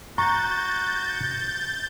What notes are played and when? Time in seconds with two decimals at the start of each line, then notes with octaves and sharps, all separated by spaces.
0.18 F#4 A#5 C#6 G6 A6